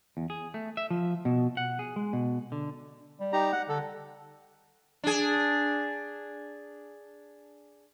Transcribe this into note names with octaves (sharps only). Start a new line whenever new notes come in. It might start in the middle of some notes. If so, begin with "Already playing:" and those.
E2
G#4
A3
E5
F3
B2
F#5
G#4
G#3
B2
D3
G3
D#4 G4 A#5
F#5
D3 A4
D4 G#4